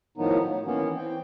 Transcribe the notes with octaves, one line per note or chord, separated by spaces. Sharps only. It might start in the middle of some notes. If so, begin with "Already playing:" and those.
A2 D#3 F3 F#3 B3 D#4
F#3
D#3 E3 A#3 B3 C#4
E3 C4 G5